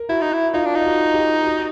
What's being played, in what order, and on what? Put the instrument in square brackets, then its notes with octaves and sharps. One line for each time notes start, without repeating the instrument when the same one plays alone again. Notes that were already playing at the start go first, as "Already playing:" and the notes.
Already playing: [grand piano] A#4
[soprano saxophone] E4 [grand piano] F#4
[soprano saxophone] D#4
E4
[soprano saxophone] D#4 [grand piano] F4
[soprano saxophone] D4
D#4
[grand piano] F#4
G4
F#4